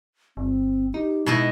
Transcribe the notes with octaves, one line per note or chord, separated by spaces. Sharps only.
G1 C4
D#4 G4
B2 G#3 E4 D#5